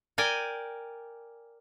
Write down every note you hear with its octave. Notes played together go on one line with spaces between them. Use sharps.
A#4 D5 G5 G#5